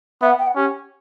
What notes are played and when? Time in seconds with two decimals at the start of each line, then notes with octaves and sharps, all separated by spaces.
0.22 B3 E5
0.30 F#5
0.39 G5
0.46 F#5
0.56 C#4 G4